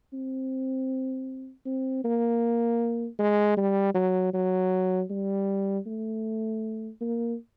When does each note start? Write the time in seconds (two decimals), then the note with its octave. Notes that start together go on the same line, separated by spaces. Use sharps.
0.13 C4
1.65 C4
2.04 A#3
3.19 G#3
3.57 G3
3.94 F#3
4.34 F#3
5.10 G3
5.86 A3
7.01 A#3